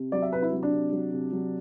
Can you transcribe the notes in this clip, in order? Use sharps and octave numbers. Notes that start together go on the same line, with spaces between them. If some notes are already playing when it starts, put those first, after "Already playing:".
Already playing: C3
F#3 D5
E5
C3 B4
E4
F#3
D4
C3
F#3
C3
F#3